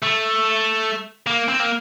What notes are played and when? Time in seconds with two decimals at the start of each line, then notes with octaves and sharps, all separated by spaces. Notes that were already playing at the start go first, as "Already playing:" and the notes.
0.02 A3
1.27 A#3
1.48 C4
1.60 A#3